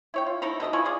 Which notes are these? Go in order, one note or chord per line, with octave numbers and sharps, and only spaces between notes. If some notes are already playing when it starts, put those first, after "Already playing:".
E4 C#5 G5
F4
A3 D#4 E4 A#5
B2 A4 D#5 A#5
E4 F4 G#5 C#6
F4 G#4 D5